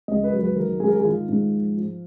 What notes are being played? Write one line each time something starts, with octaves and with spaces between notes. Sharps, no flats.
C#2 D#5
B4
F#3
B4
D#3 A#4
G#2 G#4
A#4
G#4
D#3 F4
G#2
F3
F3